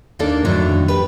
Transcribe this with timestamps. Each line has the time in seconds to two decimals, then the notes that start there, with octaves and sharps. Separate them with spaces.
0.19 D#2 A#3 D4 D#4 A4 D5
0.45 F2 A2 D3 D#3 F#3 D4
0.88 G4 B4